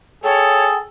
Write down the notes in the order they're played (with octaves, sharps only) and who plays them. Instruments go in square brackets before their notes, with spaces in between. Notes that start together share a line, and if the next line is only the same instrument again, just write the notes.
[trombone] G#4 [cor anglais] A4 [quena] C#5 [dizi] G5